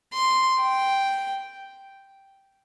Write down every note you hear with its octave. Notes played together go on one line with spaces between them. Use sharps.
C6
G5